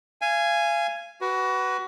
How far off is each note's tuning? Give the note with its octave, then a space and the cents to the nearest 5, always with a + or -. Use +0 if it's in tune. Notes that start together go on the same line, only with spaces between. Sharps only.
F5 -30 G#5 +0
F#4 +25 B4 +0